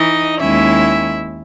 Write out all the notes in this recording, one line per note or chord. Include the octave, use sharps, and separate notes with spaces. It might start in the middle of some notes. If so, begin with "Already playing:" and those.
Already playing: E3 D#4 D#5
D#2 D#3 G#3 C#4 E4 E5